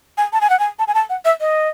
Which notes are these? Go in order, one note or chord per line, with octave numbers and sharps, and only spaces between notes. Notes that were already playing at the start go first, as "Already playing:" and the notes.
G#5
A5
G#5
F#5
G#5
A5
G#5
A5
F#5
E5
D#5